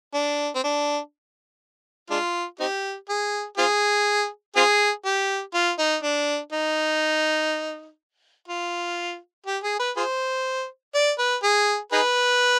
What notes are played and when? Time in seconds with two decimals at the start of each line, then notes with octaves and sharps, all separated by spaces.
0.14 D4
0.55 C4
0.63 D4
2.10 G#3 D4 F4
2.60 C4 D#4 G4
3.09 G#4
3.58 C4 F4 G#4
4.56 C4 F4 G#4
5.05 G4
5.54 F4
5.79 D#4
6.03 D4
6.52 D#4
8.48 F4
9.46 G4
9.63 G#4
9.79 B4
9.96 F4 G#4 C5
10.94 D5
11.18 B4
11.43 G#4
11.92 D#4 G#4 B4